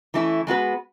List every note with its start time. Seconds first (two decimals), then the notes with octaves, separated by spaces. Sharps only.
0.14 E3 A3 C#4 E4
0.47 G#3 B3 F#4 B4